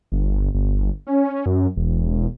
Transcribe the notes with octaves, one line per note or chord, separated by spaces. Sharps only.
G1
G1
C#4
F#2
E1